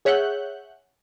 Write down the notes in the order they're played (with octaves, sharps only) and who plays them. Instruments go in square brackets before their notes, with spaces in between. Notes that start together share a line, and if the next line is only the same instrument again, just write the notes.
[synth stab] G#4 C#5 E5 F#5 F#6 G6